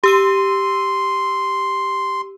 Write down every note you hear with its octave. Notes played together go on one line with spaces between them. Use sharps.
G4 C6 E6 D#7